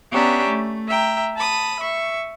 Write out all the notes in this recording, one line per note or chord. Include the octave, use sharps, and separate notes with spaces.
B3 C#4 D4 G4 E5 A#5
A3
E5 G5 A#5
A5 B5 D#6
E5 C#6